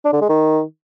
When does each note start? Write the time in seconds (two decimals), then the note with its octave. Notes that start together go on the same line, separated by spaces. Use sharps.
0.05 D4
0.13 D3
0.21 G#3
0.29 D#3